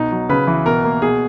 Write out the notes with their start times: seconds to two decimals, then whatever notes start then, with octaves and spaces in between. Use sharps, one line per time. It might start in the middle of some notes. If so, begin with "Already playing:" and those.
Already playing: B2 D#4
0.12 F#3
0.29 C#3 B4
0.47 E3
0.66 B2 A#4
0.84 A#3
1.02 B2 G#4